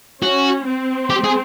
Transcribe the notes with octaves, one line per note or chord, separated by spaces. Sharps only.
C#4 F#4
C4
G4
G#4